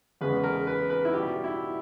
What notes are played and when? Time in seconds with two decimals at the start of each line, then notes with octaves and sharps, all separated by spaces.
0.21 E2 C#3 G#3 B4
0.44 A#4
0.67 B4
0.90 B4
1.05 E4
1.14 B2 G3 G4
1.44 E4